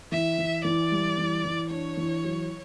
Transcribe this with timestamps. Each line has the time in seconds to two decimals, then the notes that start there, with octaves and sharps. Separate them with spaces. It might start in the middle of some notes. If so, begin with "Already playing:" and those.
0.12 E3 E5
0.38 E3
0.64 E3 D5
0.91 G3
1.18 E3
1.44 E3
1.71 D4 C#5
1.97 E3
2.24 F#3